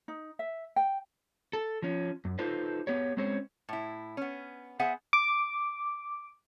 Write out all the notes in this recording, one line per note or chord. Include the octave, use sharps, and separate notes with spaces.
D#4
E5
G5
A4
F3 C#4
F#2
D#4 F4 A4 B4 C5
B3 G4 C#5
G#3 C4 C#4 C5 C#5
A2 E4
B3 C#4
B3 G#4 C5 E5 F#5 G#5
D6